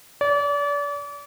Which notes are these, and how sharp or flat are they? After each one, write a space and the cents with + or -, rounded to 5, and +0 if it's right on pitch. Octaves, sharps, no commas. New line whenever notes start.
D5 -35